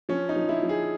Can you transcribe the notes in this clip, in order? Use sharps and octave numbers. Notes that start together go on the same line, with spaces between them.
F3 C#4
D#4
F3
E4
F3
G#4